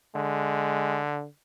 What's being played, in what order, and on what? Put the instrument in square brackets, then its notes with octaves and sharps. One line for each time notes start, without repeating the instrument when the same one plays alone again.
[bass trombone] D3 [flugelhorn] G#3